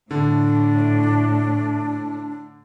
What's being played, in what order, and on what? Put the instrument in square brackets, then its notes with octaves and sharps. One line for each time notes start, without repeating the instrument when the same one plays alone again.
[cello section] A2 [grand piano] D3 [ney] D4